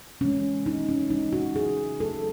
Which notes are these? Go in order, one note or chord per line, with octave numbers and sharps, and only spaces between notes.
E3 G#3 C#4
C#3 D#4
C#4
E3 G#3 D#4
F#4
C#3 G#4
F#3 A3 A4